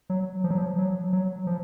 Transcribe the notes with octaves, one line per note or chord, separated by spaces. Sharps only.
F#3
F3
F#3
F3
F#3
F#3
F3